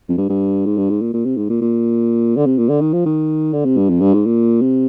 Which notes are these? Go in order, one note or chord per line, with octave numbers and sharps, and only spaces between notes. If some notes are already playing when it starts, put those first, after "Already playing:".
F2
G2
G2
G#2
G2
G#2
A#2
A#2
C3
G#2
A#2
A#2
D3
C3
A#2
D3
D#3
F3
D#3
D3
C3
G2
F2
G2
G#2
A#2
C3